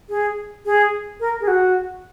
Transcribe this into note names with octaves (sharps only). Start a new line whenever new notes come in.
G#4
G#4
A#4
G#4
F#4